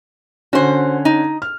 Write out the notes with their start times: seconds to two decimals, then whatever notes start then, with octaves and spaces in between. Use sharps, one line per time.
0.53 D3 C#4 F#4 C5
1.05 D#4
1.42 F6